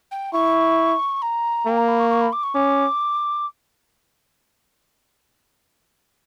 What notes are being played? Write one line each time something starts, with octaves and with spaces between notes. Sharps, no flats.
G5
E4 C#6
A#5
A#3 G5
A#5
B5
C#6
C#6
B5
D6
C#6
C#4 D6